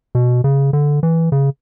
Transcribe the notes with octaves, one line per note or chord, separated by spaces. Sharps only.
B2
C#3
D3
E3
C#3